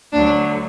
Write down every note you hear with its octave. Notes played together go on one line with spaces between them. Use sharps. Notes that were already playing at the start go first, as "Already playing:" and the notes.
D2 D3 F#3 D4